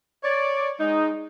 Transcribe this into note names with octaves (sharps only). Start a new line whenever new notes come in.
C#5 D5
G#3 D#4